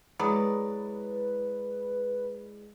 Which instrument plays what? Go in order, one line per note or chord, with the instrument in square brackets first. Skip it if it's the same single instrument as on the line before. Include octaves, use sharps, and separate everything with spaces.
[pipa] F#3 [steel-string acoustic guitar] G#3 E4 D5 [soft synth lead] B4 [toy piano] B5 D#6